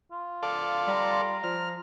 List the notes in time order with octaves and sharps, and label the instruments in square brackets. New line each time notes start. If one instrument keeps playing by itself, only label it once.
[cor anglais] F4
[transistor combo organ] A4 D5 F5
[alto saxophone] G3 [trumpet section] A#5 C6
[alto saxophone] F3 [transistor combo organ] F6